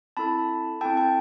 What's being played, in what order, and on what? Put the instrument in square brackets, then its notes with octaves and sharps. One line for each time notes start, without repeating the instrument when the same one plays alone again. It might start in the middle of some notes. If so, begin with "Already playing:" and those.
[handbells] C4 E4 A4 A5 B5
C4 E4 A4 G5 A5
G5 A5